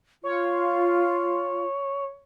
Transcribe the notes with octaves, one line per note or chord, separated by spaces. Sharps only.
F4 C#5